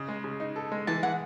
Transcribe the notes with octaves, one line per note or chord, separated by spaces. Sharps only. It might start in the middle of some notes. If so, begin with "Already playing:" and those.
Already playing: C#3 D#5
G#3
C#3
D#4
A4
G#3
E3 A5
E3 F#5